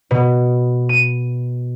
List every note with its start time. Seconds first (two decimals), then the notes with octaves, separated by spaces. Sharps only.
0.11 B2
0.89 D#7